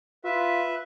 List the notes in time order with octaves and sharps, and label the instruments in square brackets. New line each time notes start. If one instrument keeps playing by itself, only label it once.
[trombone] F4 [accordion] B4 E5